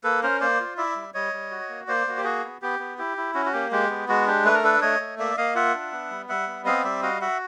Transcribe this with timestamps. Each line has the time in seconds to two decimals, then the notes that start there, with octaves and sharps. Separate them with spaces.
0.04 A#3 A4 B4
0.23 C#4 A#4 C5
0.41 A#3 C5 D5
0.60 F4
0.77 E4 D5 E5
0.96 G3
1.14 G3 C#5 D#5
1.33 G3
1.51 F#4
1.69 A#3
1.88 A#3 C5 D5
2.07 A#3 F#4
2.18 G4
2.24 F#4 G#4
2.44 B3
2.62 B3 G4
2.79 B3
2.98 E4 G4
3.17 E4
3.34 C#4 F#4
3.46 F#4
3.53 A#3 G4
3.71 G#3 G4
3.90 B3
4.08 G#3 F#4
4.26 D4 G4
4.45 A3 B4
4.54 A#4
4.64 D4 A4 B4
4.82 A3 C#5 D#5
5.00 A3
5.18 A#3 D5 E5
5.37 A#3 D#5 F5
5.55 F4 E5 F#5
5.74 D4
5.92 B3
6.11 G3
6.29 G3 E5 F#5
6.47 B3
6.65 C4 D#5 F5
6.84 G3 D5 E5
7.02 F#4 D#5 F5
7.21 F#4 E5 F#5